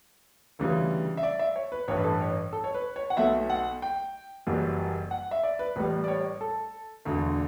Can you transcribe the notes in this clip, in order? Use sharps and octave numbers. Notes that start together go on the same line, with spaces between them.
D2 C#3 E3 G3
E5
D5
E5
C#5
B4
A1 G2 E3 C#5
B4
A4
B4
C#5
A4
C#5
B4
C#5
F#5
B1 B2 A3 E5
F#5
G5
F#1 F#2 E3 G3
F#5
E5
D5
B4
A1 A2 G3 B4
D5
C#5
A4
E1 D2 D3 A3